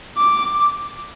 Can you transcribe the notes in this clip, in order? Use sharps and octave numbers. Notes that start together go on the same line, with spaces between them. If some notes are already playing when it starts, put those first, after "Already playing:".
D6